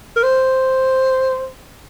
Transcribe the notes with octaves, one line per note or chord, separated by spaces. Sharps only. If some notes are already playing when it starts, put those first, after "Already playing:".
A#4
C5